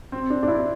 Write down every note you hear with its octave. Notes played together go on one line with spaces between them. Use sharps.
C4
D4
D4
E4